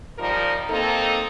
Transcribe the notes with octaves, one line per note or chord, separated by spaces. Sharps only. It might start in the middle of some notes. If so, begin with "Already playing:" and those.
F3 G3 D#4 A#4
A#3 C4 D#4 A4